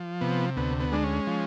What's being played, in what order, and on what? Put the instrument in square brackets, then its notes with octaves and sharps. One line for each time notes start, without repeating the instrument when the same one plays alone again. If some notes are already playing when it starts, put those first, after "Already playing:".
Already playing: [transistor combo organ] F3
C3 B3
D2 B3
B3
G#3 D4
C#4
F3